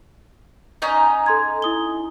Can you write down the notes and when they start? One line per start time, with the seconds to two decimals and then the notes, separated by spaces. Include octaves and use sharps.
0.82 C#4 D#4 D#5
1.26 A4 C6 G#6
1.62 E4 D#6 G7